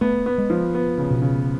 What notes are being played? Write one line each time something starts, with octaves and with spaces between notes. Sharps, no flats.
A3 B3
B3
G#3
F3
B3
C#3
B2
C#3